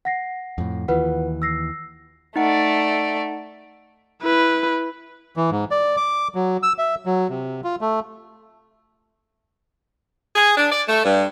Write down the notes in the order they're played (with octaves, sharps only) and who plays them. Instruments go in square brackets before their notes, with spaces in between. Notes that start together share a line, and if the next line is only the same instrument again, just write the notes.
[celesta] F#5 A#6 C7
[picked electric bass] F2 A2
[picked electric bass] D#2 E3 [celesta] F4 B4 F#5
[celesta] E6 A#6 C7
[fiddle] A3 D5 [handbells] D#4 F#5
[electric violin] E4 B4
[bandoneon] E3
G#2
D5
D6
F#3
E6
E5
F#3
C3
F4
A3
[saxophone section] G#4
D4
D5
A3
G2